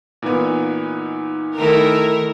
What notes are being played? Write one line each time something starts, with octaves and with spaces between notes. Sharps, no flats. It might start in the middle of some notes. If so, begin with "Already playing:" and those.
A#2 E3 B3 D#4
D#3 A3 E4 A#4